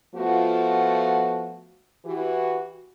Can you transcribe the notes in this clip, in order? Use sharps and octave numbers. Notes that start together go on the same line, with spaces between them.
F3 A3 B3 F4 F#4
E3 F#4 G4